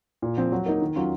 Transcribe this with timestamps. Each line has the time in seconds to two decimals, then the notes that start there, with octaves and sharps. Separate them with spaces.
0.22 A#2
0.37 F3 C4
0.52 F#3
0.66 A#3 D#4
0.82 D#3
0.96 F#3 C#4 F4